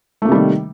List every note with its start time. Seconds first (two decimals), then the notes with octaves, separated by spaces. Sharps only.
0.22 A3
0.25 A#3
0.28 C3
0.32 G3
0.35 D#3